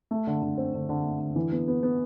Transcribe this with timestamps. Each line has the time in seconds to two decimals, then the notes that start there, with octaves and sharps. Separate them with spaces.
0.11 A3
0.27 D3
0.42 D3
0.58 C4
0.74 D3
0.89 D3
1.05 A3
1.20 D3
1.36 E3
1.52 B3
1.68 B3
1.83 B3